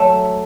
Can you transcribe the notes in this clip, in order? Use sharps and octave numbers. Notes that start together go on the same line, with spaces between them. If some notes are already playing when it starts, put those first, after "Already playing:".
Already playing: F#3 A3